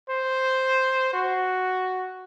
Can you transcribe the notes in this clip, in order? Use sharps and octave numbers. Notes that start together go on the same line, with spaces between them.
C5
F#4